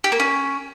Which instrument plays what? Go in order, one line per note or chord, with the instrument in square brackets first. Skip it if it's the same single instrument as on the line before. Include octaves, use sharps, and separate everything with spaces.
[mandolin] G4
A#3
C#4